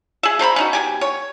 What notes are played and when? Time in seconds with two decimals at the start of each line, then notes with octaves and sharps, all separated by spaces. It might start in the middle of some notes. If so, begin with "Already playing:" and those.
0.23 G#4 E5
0.39 A3 C5 A#5 B5
0.56 C#4 D#4 F#4
0.73 B2 G4 G#5
1.01 C#5